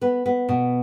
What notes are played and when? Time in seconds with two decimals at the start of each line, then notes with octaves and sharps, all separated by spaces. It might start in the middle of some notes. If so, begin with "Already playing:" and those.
0.01 B3 B4
0.26 B3
0.49 B2